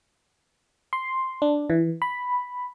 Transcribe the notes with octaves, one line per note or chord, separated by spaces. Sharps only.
C6
D4
E3
B5